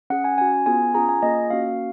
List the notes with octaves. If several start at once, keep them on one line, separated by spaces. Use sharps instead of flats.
C#4 G#4 F#5
G#5
C#4 F#4 G#5
B3 F4 G#4 G#5
C#4 F4 G#4 A#5
G#5
A#3 F4 G#4 D#5
A#3 C#4 F#4 F5